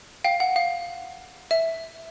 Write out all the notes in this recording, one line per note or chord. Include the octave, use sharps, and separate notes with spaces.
F5 G5
F#5
F5
E5